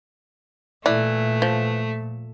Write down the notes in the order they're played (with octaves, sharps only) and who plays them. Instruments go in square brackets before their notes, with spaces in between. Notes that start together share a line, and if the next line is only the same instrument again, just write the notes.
[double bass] A#2 [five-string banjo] E3 [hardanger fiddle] A3 [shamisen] D5
[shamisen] F3